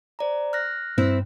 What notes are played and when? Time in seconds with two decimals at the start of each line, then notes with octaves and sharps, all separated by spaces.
0.19 C5 D5 A#5
0.53 F6 F#6 A#6
0.98 G2 C4 E4